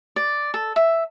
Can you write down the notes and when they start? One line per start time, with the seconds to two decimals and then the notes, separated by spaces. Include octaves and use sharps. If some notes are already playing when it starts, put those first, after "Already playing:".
0.16 D5
0.54 A4
0.76 E5